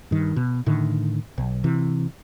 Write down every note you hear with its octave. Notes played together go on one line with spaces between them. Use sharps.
G2 D#3
B2
A2 D3 D#3
B1
C3 E3